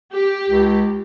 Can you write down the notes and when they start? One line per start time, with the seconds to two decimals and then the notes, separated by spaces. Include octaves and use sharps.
0.13 G4
0.50 C#2